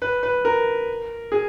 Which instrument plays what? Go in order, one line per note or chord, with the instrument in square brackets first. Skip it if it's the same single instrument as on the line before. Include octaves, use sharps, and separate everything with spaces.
[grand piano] B4
B4
A#4
G#4